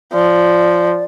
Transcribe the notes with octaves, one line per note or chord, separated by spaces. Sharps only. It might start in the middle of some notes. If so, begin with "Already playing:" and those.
F3 D5